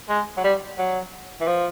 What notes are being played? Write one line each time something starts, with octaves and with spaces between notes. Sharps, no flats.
G#3
F#3
G3
F#3
E3
F3